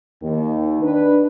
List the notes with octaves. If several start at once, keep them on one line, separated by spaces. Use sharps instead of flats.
D#2 D#3
D4 B4